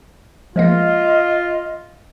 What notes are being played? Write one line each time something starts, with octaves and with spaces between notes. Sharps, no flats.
F3 G#3 A#3 F4 D#5